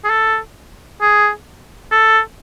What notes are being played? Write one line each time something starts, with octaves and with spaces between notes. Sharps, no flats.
G#4
A4
G#4
A4